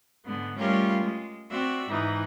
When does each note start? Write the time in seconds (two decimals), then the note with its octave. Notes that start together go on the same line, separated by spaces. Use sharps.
0.24 G#2 D3 G#3 B3
0.57 G3 A3 C#4 F4 G4 A#4
1.03 G#3
1.50 C4 F#4 D5 E5
1.87 G#2 E3 D#4